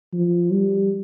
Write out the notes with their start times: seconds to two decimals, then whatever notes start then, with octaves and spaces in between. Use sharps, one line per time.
0.14 F3
0.52 G3